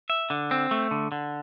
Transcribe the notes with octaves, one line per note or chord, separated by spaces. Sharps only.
E5
D3
C4
A3
D3
D3